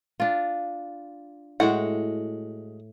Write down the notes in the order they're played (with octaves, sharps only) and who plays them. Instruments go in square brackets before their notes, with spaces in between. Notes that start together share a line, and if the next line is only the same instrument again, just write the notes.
[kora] D4 F4
[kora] A2 [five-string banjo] G#3 F#4 F#5